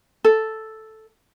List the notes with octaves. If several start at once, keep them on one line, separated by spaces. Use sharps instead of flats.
A4